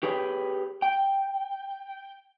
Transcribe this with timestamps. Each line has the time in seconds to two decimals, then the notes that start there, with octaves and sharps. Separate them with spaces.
0.03 G4 G#4 B4 C#5 F#5 G5
0.82 G5